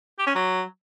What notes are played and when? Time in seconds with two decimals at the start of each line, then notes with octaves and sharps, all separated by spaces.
0.18 G4
0.27 C#4
0.35 F#3